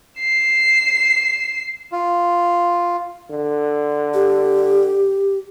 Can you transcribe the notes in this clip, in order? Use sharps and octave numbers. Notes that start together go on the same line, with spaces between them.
C7 E7
F4
D3
G4